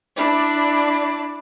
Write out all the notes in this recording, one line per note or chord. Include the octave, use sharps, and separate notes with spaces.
D4 E4 D5